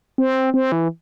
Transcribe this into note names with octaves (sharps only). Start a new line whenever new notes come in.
C4
C4
E3